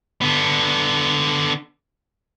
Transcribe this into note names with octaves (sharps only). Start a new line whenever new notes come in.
D3 B3